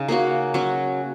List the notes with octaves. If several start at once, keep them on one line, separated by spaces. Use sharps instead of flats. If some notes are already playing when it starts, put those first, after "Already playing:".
Already playing: C#3 D#4 G#4
A#3 C#4 F#4
F#3 C#4 F#4